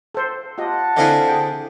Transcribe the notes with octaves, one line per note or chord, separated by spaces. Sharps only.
A4 C5
F4 G4 D#5 F#5 A5
D3 C4 E4 D#5 F5 G#5
G#4 G5